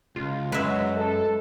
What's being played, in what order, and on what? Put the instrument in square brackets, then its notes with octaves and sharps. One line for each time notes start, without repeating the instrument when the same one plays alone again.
[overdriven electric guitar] C#2 [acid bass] F4
[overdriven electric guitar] F#2 [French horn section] F#3 [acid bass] G#3 [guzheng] B4 E5
[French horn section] A4